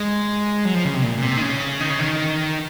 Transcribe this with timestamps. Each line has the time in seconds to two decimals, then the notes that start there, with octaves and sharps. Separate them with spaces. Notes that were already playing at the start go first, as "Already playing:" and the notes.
Already playing: G#3
0.65 F#3
0.74 F3
0.85 C#3
0.94 C3
1.03 A#2
1.17 A#2
1.22 C3
1.37 D#3
1.42 C#3
1.81 D#3
1.90 C#3
1.99 D#3